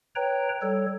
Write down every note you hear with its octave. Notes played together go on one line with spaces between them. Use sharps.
B4 C#5 G5 A#5
G3 A4 C#5